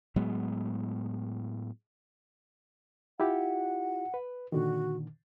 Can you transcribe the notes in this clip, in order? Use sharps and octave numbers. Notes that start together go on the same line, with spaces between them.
A2 F#3 G#3 B3
E4 F4 G4 F#5
B4
A#2 D3 D#3 F#4